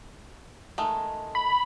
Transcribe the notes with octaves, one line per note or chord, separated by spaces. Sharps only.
D#3 G#3 A3
B5